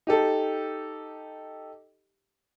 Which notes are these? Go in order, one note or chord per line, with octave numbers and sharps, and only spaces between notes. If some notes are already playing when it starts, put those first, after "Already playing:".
D#4 G4 A4